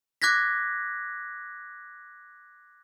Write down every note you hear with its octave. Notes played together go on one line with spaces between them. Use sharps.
D6 F#6 G#6 A#6 B6